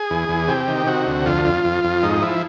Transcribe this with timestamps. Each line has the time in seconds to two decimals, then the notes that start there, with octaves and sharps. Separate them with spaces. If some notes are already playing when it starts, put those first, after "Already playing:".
Already playing: G#4
0.10 E2
0.29 E2
0.48 C3 G4
0.68 D#3
0.87 C3 F#4
1.06 D2
1.26 F2 F4
1.45 F2
1.64 F2
1.84 F2
2.03 G#2 D#4
2.22 F3 E4